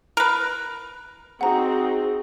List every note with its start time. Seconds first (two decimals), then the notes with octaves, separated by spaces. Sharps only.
0.17 A#4 B4
1.41 C4 D#4 F#4 G#4 F#5 A#5